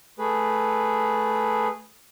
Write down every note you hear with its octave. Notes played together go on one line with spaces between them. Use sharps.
A3 G#4 B4